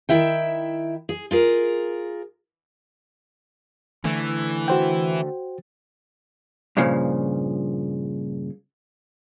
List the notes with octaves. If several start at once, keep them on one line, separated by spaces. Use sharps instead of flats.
D#3 E4 E5 G5
G#4
F4 G#4 A#4
D3 E3 A3
F#4 C5 G5
G2 A#2 C#3 F3